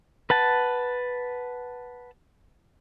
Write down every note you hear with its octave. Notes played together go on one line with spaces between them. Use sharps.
B4 F#5 A5